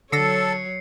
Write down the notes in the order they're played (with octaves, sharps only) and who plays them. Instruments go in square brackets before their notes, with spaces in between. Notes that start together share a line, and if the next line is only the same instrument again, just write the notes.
[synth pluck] D3 E6 A#6 [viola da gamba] F#3 C#5 [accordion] A4 [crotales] C7 C#7